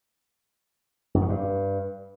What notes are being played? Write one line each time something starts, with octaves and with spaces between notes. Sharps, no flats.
F#2
D#3
G2